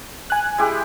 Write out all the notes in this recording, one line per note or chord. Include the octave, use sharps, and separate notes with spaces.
G#5 F#6
G#3 E4 G4